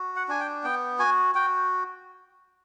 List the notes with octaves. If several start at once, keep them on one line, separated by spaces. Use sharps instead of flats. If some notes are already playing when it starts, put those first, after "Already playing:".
Already playing: F#4
F#5
D4 G#5
G5
B3 G5
F#4 G#5
F#4 G5